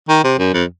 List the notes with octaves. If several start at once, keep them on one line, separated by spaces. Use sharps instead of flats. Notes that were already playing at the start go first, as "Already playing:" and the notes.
D#3
C3
F#2
F2